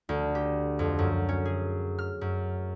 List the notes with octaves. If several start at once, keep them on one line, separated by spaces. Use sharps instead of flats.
D2
G4
F2
F#2
C#4
G#4
F6
F#2